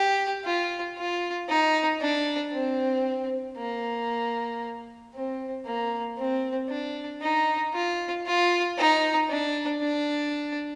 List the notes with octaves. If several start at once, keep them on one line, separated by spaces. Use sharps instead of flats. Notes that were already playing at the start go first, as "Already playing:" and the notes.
Already playing: G4
F4
F4
D#4
D4
C4
A#3
C4
A#3
C4
D4
D#4
F4
F4
D#4
D4
D4